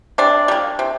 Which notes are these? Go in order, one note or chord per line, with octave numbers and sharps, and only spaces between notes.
C3 D4
G3 A#3
C3